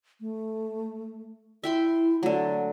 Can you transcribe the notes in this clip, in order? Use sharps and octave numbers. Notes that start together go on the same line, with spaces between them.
A3
E4 E5 G5 C6
D3 F#3 A3